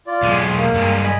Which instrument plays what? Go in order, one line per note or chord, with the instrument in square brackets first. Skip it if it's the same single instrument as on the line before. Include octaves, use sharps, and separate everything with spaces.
[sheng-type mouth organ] F4 D5
[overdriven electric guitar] B1 G#3
[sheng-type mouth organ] C6 C#6
A#3
[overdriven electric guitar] G2 G#3
[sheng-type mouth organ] D#5 G#5 B5